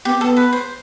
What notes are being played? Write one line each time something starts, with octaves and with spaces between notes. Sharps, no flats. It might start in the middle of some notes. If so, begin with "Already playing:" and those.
B3 G4
B3 A4
B4
C5